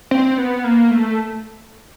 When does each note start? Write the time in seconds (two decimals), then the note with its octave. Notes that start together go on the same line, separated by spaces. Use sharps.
0.11 C4
0.38 B3
0.64 A#3
0.91 A3